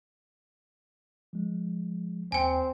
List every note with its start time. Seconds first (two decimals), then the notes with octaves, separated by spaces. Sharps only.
1.33 F3 G#3
2.32 D#2 C4 G5 G#5